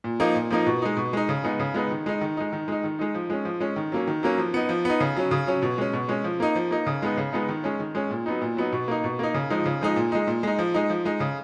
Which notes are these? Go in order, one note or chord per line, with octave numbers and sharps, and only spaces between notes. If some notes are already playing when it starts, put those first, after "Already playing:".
A#2
F3 A#3 D#4
A#2
F3 A#3 D#4
B2
G#3 D#4
B2
G#3 D#4
C#3
G#3 B3 D#4
C#3
G#3 B3 D#4
D#3
G#3 D#4
D#3
G#3 D#4
D#3
G#3 D#4
D#3
G#3 D#4
F3
G#3 C#4
F3
G#3 C#4
D#3
F#3 A#3 C#4
D#3
F#3 A#3 C#4
F3
B3 D#4
F3
B3 D#4
C#3
F#3 C#4
C#3
F#3 C#4
B2
G#3 C#4
B2
G#3 C#4
F3
A#3 D#4
F3
A#3 D#4
C#3
G#3 B3 D#4
C#3
G#3 B3 D#4
D#3
G#3 C#4
D#3
G#3 C#4
A#2
F#3 B3 D#4
A#2
F#3 B3 D#4
B2
A#3 D#4
B2
A#3 D#4
C#3
F3 G#3 D#4
C#3
F3 G#3 D#4
A#2
G#3 D#4
A#2
G#3 D#4
F3
G#3 D#4
F3
G#3 D#4
C#3